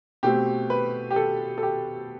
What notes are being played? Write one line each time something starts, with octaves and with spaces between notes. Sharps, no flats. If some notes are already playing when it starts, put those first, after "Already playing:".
B2 A3 C4 G4
B4
G4
A4
A4
G4